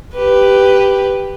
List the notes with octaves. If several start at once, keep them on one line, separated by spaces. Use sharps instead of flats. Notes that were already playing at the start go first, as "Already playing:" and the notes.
G4 B4